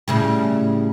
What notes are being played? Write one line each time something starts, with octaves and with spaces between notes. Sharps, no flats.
A2 C#3 G3